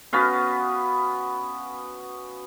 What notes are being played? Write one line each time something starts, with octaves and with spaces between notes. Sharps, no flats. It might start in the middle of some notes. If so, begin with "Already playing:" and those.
B3 C#4 F#4 F5